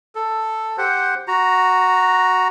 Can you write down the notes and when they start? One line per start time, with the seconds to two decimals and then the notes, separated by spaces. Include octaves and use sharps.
0.15 A4
0.78 G4 C5 F#5
1.28 F#4 A#5